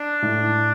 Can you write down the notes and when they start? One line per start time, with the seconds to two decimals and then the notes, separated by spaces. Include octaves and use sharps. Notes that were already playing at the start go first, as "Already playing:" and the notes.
Already playing: D4
0.22 A2